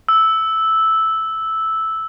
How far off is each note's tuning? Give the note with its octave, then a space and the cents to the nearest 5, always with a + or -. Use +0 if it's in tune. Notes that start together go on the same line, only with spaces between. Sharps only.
E6 -5